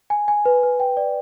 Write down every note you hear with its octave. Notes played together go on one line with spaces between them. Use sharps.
G#5
G#5
B4
B4
G5
D5